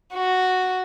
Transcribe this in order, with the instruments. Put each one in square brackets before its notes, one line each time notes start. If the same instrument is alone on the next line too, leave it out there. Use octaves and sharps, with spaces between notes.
[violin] F#4